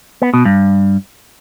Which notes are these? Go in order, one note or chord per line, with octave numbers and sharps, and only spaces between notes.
B3
B2
G2